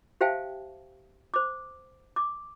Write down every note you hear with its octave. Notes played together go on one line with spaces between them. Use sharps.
G4 C5 E5 F5 G5 A5
C5 D6
D6